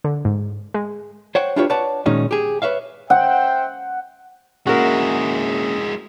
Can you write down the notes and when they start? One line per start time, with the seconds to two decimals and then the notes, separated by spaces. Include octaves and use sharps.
0.04 D3
0.25 G#2
0.74 G#3
1.35 C5 C#5 F#5 G5
1.56 D4 E4 F4 G4 B4 C#5
1.70 B4 C#5 D5 F#5 A5
2.06 A#2 D#3 G#3 C#4 D#4 F#4
2.31 G4 G#4
2.62 B4 C#5 E5 F5
3.10 C5 E5 F#5 G5
4.67 G#3 A#3 C#4 E4 F#4 G#4 A#4